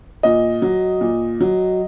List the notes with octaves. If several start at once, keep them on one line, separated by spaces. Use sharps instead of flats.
A#2 D#5
F#3
A#2
F#3